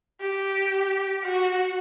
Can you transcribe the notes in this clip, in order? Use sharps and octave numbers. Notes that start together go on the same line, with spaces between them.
G4
F#4